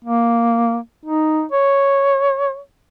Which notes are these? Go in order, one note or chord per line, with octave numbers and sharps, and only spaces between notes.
A#3
D#4
C#5